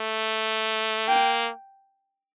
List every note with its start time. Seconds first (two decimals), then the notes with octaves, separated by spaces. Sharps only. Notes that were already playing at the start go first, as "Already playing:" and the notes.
Already playing: A3
1.08 A#3 G5